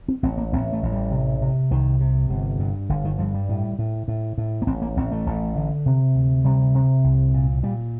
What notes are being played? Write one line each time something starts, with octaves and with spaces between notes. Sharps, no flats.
C4
A1 C4
A#3
A1 C4
A3
A1
G3
C3
C3
C2 D#3
C3
G1
G2
G1 D3
D#3
G2 F3
G3
A2
A2
A2
A2
A#3
A1 C4
A#3
A1 C4
A3
A1
D3
C3
D2
C3 G3
C3
C2
A#2
A#2 G3